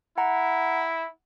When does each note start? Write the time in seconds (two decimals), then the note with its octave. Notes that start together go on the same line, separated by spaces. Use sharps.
0.17 E4 F#5 A#5